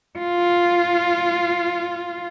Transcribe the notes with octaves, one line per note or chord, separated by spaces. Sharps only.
F4